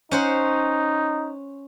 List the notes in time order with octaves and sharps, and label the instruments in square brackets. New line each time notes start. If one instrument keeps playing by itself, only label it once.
[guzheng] C#4 C5 F#5 [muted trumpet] D#4